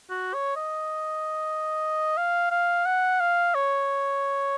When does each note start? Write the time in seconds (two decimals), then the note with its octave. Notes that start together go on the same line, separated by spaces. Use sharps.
0.10 F#4
0.34 C#5
0.56 D#5
2.17 F5
2.51 F5
2.86 F#5
3.20 F5
3.55 C#5